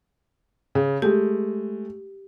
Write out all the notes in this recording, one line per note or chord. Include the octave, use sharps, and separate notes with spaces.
C#3
G#3 A3 G4